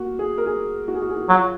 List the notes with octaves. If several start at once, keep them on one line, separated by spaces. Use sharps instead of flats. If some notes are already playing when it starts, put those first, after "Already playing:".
Already playing: A#3 F#4
G#4
A#4
G#4
F#4
G#4
F#4
G#4
F#4
F#3 F4